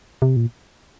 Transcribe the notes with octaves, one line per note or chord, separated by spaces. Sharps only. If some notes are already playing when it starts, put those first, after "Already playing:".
C3
A#2